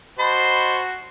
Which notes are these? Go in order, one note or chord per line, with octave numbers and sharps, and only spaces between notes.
F#4 C5 D#5 A5 B5